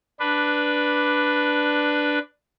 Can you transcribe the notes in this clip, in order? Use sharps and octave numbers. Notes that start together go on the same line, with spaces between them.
D4 B4